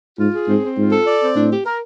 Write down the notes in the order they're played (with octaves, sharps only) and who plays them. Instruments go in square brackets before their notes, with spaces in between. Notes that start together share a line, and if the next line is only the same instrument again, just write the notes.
[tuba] G#2 [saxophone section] F4
[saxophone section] G#4
[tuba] G#2 [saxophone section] C4
[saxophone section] C4
[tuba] G#2 [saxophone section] F4
[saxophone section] A4
D5
C4
[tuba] A2 [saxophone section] D4
[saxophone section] G4
A#4